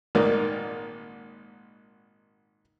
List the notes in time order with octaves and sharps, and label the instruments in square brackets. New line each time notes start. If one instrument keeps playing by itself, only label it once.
[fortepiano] G#1 A#2 A#3 D#4 A#4 D5